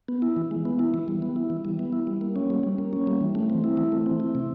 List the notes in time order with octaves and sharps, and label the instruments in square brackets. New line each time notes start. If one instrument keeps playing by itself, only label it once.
[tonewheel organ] B3
E4
E3
G#3
B3
E4
E3
G3
B3
E4
E3
G3
B3
E4
G3
A#3
C#4
G3
G3
A#3
C#4
G3
E3
A3
C4
E4
E3
A3
C4
E4
C3